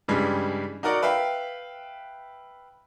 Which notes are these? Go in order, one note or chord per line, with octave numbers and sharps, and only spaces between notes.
G2 C#3 E3 G3 G#3
D#4 F#4 A#4 D5 F#5
B4 E5 F5 G5